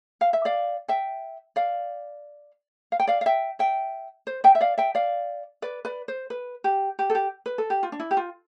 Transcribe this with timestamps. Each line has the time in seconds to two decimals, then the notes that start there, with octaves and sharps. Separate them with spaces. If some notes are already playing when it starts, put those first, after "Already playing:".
0.21 F5
0.33 E5
0.45 D5 F5
0.88 E5 G5
1.56 D5 F5
2.92 F5
3.00 G5
3.07 D5 F5
3.21 F5
3.26 E5 G5
3.59 E5 G5
4.27 C5
4.44 E5 G5
4.55 E5
4.61 D5 F5
4.78 E5 G5
4.95 D5 F5
5.62 B4 D5
5.85 B4 D5
6.08 C5
6.30 B4
6.64 G4
6.99 G4
7.10 A4
7.15 G4
7.46 B4
7.58 A4
7.70 G4
7.83 F4
7.92 D4
7.99 E4
8.11 G4
8.17 F4